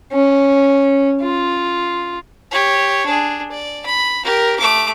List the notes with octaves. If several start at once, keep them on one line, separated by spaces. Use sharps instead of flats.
C#4
F4
G4 C#5
D4 G#4
D5
B5
G4 A#4
A3 D6